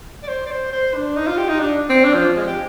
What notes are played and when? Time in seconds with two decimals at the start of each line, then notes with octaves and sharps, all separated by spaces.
0.23 D5
0.28 C5
0.47 D5
0.51 C5
0.73 C5
0.94 D4
1.16 D#4
1.27 F4
1.38 G4
1.49 D#4
1.59 D4
1.90 C4
2.04 D4
2.14 F3
2.37 G#3
2.47 G4